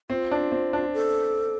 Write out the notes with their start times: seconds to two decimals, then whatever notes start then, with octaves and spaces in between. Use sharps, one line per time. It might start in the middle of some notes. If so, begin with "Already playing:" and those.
0.10 C4 F4
0.32 D4
0.52 C4
0.73 D4
0.93 A4